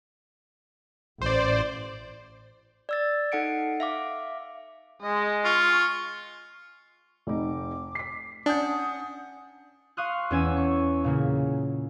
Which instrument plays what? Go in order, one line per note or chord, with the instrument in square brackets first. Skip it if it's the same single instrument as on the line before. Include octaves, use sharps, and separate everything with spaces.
[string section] A1 [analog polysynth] C5 D5
[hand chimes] D5 E6 A6
D#4 A4 F#5 C#7 D7
E5 F5 D6
[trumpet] G#3 [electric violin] D#5
[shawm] F4 [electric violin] C#6
[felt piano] F1 D#4 [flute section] D6
[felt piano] B6 C7
[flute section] C#4 F#5 D#6 [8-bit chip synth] D4 [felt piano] G#5 G6
[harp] F5 C6 C#6 D#6 F6 F#6
E2 C#4 G#5 E6
C#6
A#2 C#3 A#3